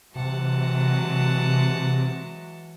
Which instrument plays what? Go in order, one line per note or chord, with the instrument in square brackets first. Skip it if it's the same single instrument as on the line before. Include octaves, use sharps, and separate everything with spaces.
[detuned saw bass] C3 [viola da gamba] E3 F#3 G#3 [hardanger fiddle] F#5 A5